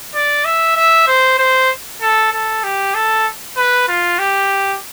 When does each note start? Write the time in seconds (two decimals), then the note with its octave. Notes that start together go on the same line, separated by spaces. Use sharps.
0.14 D5
0.45 E5
0.77 E5
1.07 C5
1.39 C5
2.01 A4
2.32 A4
2.64 G4
2.95 A4
3.57 B4
3.88 F4
4.19 G4